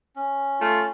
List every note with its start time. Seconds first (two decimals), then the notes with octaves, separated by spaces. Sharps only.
0.16 C#4
0.61 A3 F4